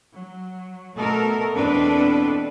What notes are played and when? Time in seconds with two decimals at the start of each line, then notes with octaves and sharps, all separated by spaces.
0.16 F#3
0.97 B2 A3 A4 A#4
1.56 E2 B2 C4 D4 A4 B4